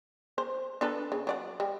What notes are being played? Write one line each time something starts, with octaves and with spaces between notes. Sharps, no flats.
C5
D4 A4 B4
C#3
F#3 D5 F#5
G3